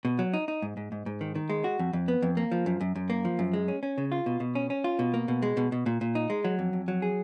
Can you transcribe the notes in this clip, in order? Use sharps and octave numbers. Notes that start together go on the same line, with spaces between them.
B2
F#3
D#4
D#4
G#2
G#2
G#2
G#2
D#3
D#3
G#3
F#4
F2
F2
B3
F2
A#3
F3
F#2
F#2
F#2
A#3
F3
F#2
G#3
C#4
C#4
C#3
F4
B2
B2
C#4
C#4
F4
B2
A#3
B2
G#3
B2
B2
A#2
A#2
D#4
G#3
F#3
F2
F2
F#3
G#4